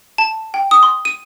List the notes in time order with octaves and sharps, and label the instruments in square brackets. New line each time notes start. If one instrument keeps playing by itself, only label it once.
[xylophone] A5
G5
D#6
C6
D#7